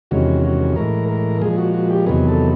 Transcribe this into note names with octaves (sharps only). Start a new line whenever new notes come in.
E2 C3 D#3 G#3 C#4 F#4
F#4
A2 E3 G#3 A#4
A#4
A#2 F3 G#3 G#4
F#4
F#4
G4
E2 C3 D#3 F#3 B3 G#4
A4